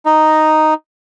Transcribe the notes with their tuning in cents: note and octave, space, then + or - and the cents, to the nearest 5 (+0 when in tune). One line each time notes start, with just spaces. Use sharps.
D#4 +0 A#5 +0